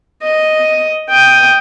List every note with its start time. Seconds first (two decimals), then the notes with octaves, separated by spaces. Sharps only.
0.22 D#5
1.09 G5 D#6